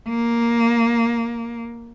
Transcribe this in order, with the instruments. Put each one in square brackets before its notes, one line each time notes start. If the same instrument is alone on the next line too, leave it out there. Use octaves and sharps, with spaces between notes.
[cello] A#3